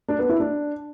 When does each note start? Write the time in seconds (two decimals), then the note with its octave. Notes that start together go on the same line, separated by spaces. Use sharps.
0.08 D4
0.19 B3
0.29 E4
0.40 D4